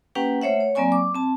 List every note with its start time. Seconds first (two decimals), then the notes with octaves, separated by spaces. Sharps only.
0.15 A#3 C#4 G4 B4 F#5 G5
0.42 A3 C5 C#5 E5 F#5
0.60 C#5
0.75 F#3 A#3 C4 D5 G#5 C#6
0.92 D6
1.14 C4 A5